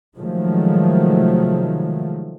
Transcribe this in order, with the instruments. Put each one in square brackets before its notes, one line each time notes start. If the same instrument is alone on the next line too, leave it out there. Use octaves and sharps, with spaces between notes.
[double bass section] C3 D#3 F3 F#3 G#3 A3